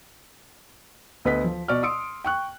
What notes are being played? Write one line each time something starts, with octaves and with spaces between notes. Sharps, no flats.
D2 B3 B4 D#5 B6
F3
B2 D5 C#6 F6
C6 D#6 E6 C#7 D7
G5 C#6 F#6